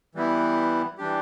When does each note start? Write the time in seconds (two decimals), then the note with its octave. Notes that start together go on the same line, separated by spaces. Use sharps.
0.15 E3 G3 B3 E4
0.98 E3 G3 D4 G4